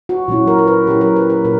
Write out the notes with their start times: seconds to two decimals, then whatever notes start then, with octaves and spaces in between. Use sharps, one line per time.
0.09 F#4
0.28 A#2 F#3 C#4 E4
0.47 A#4
0.58 A#4
0.67 B4
0.86 A#2 F#3 C#4 E4 G4
1.01 A#4
1.16 B4
1.30 B4
1.45 A#2 A#4